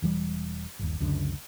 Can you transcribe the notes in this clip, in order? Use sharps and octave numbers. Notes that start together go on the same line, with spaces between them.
E1 E3 G3
G1 D#2
C#2 F#2 D3